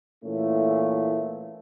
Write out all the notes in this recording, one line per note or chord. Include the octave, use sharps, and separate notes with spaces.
A#2 E3 A3 C#4 E4